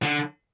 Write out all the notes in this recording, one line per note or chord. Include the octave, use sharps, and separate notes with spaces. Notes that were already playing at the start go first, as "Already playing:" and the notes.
D3